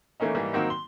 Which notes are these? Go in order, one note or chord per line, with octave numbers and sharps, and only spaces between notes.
E3 A3 A#3 C#4 D#4
G#2 E3 G3 A#3
D#3 F#3 A#3 C4 D#4 F#4
C6 G7